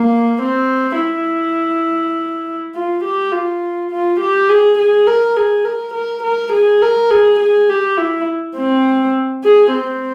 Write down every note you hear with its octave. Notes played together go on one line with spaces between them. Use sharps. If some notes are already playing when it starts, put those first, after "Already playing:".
Already playing: A#3
C4
E4
F4
G4
F4
F4
G4
G#4
G#4
A#4
G#4
A#4
A#4
A#4
G#4
A#4
G#4
G#4
G4
E4
C4
G#4
C4